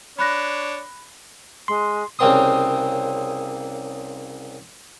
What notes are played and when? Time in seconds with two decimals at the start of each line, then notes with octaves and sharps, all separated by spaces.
0.19 D4 C#5 B5 F#6 A#6
1.68 G#3 C6
2.19 C2 C#3 A#3 C4 C6 D#6